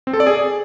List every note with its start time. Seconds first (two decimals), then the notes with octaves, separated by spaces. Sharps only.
0.07 C4
0.13 A4
0.20 D5
0.26 G#4